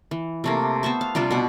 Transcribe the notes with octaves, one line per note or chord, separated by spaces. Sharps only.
E3
C3 A3 A#3
B3 A4 C5 C#6
F5
C3 G3 D4 F4
B2 F#5